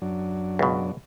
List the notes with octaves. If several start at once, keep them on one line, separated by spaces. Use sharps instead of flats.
F#2 F#3 D4
C#2 B2